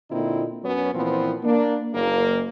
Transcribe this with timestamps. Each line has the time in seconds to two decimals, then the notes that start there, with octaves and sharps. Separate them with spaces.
0.11 A#2 D3 C4 D#4 E4
0.64 F#2 F#3 B3 C#4
0.94 A#2 E3 F3 B3 C4
1.44 A#3 D4
1.94 F#1 A#3